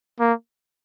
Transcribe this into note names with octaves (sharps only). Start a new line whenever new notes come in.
A#3